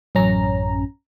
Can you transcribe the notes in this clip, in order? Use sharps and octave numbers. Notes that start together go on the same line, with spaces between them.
A1 F#2 C#4 A#5